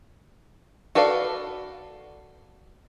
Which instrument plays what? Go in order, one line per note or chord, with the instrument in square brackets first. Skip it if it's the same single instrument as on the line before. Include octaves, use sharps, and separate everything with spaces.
[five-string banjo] F#4 A4 B4 D5 F5